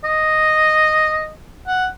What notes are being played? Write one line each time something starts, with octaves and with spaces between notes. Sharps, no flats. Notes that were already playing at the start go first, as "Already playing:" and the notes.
D#5
F#5